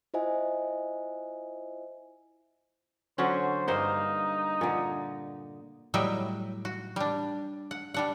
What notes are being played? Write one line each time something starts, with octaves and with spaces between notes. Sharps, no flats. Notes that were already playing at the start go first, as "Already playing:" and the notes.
E4 F4 C5 D#5 E5 G#5
D3 F#3 C#4 C5
G2 A#3 D#4 C5
A#2 D3
A2 F#3 G3 D#5 E5 G5
F#4
G3 D4
F#5
G3 D4 F#5